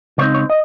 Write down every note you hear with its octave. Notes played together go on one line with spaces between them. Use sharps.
C#3 G#3 C4 D#4 C#5
C#5
D#5